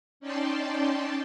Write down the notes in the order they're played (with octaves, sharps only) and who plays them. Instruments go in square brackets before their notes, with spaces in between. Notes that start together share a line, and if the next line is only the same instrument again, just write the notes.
[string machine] C#4 D#4 D5 G5 A5 C6